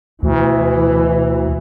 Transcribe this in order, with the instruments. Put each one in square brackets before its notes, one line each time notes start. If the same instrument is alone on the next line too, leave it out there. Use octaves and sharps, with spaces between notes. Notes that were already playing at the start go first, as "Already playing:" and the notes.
[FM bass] D2 [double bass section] B2 E3